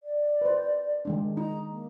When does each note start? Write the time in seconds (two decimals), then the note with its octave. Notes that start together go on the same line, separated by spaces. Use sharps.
0.03 D5
0.42 B4 C5
1.05 D#3 G#3 D4
1.37 D#4 A#5
1.70 A#3